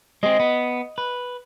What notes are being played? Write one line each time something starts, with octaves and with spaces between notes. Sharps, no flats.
G#3 C4 D#5
B3
B4